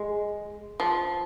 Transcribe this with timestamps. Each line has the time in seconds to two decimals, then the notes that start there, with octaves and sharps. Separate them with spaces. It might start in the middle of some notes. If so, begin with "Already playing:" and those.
Already playing: G#3
0.80 F3